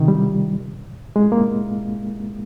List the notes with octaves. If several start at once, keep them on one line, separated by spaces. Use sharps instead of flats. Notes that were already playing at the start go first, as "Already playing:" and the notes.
Already playing: C3 D#3
G3
G#3
A#3